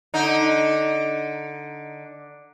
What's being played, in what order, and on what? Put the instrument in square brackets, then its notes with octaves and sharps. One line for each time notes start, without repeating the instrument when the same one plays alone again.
[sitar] D3 D#4